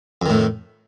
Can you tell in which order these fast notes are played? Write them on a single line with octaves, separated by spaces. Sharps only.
F2 D#3 A2